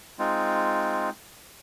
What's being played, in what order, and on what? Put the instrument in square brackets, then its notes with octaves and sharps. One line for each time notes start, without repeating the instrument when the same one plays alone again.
[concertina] G#3 C4 D#4 F4